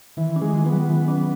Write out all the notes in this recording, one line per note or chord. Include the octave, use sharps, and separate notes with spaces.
D#3 E3
C#4
G#3
D#3
B3
F#3
D#3
C#4